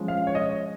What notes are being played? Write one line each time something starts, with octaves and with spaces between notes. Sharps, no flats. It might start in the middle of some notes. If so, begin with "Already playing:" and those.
Already playing: F3 G#3 C#4
F5
C#5
D#5